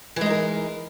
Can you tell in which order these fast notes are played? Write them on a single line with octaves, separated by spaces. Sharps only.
E3 G#3 D#4 A#4